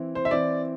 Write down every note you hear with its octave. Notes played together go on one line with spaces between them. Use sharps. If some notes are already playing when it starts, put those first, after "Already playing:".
Already playing: E3 C4 E4
C5
E5
E3 C4 E4 D5